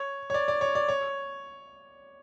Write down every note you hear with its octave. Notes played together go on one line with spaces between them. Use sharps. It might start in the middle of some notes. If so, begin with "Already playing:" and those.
Already playing: C#5
C#5
D5
D5
C#5
D5
C#5